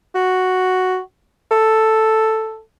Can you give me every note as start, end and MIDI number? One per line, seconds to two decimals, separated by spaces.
0.15 1.00 66
1.51 2.61 69